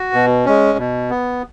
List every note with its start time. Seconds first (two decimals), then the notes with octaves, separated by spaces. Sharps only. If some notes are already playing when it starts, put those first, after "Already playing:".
Already playing: F#4
0.13 B2
0.45 G#3 C#4
0.78 B2
1.10 B3